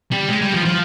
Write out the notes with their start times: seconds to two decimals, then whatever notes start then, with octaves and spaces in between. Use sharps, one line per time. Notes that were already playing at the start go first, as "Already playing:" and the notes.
0.11 G3
0.29 G#3
0.41 G3
0.53 F3
0.65 F3